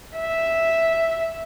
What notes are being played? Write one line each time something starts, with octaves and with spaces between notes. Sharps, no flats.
E5